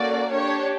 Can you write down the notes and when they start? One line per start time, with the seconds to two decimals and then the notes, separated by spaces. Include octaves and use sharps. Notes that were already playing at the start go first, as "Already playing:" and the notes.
Already playing: A#3 C#4 F#4 A4 D5
0.31 D4 G4 C#5